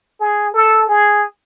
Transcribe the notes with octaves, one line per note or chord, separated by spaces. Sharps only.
G#4
A4
G#4